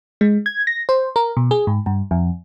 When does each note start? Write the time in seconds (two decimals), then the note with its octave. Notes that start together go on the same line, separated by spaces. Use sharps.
0.21 G#3
0.46 G#6
0.67 A#6
0.89 C5
1.16 A#4
1.37 B2
1.51 G#4
1.67 G#2
1.86 G2
2.11 F2